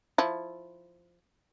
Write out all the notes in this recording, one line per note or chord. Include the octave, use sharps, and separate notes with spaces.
F3 E4